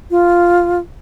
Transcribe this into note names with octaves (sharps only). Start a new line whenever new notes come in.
F4